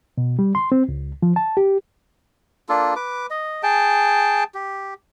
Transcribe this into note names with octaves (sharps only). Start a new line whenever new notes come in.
B2
G3
C6
C4
C#2
F3
A5
G4
A#3 D4 F4 A4
B4 D6
D#5
G#4 G5 A5
G4